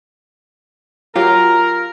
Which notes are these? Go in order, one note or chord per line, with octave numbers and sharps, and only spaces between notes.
F#3 F4 G4 A#4 A#5